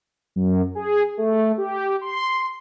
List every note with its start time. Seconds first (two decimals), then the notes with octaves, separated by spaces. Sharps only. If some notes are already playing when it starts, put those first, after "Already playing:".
0.36 F#2
0.75 G#4
1.18 A3
1.58 G4
2.01 C6